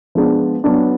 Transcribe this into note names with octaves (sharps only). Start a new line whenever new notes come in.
F3 G#3 B3 D4
F#3 B3 D4